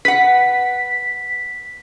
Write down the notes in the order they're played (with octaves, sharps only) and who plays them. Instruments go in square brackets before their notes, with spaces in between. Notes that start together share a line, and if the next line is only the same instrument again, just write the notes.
[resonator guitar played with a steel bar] B4 F#5 [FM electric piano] B6